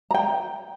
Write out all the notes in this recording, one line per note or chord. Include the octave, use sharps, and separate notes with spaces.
A#5
G5